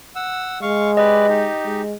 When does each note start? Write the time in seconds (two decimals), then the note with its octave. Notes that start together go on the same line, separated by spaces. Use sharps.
0.15 F#5 E6
0.62 G#3 F5 C#6
0.97 G4 B4 D5 D#5
1.29 D#4 G4
1.65 G#3